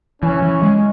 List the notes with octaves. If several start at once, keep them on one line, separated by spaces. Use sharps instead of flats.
E3 C#4
E3
G#3